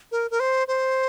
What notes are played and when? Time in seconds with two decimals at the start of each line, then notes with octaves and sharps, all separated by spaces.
0.11 A#4
0.31 A#4
0.40 C5
0.68 C5